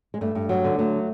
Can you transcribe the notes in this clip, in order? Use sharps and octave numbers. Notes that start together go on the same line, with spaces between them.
G#3
G2 A3
G2
F#3
D3
F#3 A3